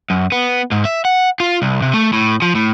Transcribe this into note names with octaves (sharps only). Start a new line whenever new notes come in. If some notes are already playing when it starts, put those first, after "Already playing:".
F#2
B3
G#2
E5
F#5
F4
C2
C3
A3
A2
F3
A2